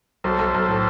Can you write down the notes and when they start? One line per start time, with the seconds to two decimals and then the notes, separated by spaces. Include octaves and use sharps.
0.24 B1 A4 C5
0.39 B1
0.54 B1
0.69 A2